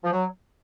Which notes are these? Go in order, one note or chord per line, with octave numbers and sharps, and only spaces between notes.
F3
F#3